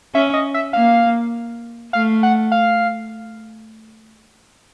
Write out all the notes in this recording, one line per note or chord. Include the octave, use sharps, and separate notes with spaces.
C#4 E5
D#5
E5
A#3 F5
A3 F5
F#5
F5